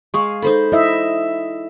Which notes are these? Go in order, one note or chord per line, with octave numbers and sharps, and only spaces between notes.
G#3 G#4 F5 C#6
D#4 A4 C5 B5
E4 D#5 E5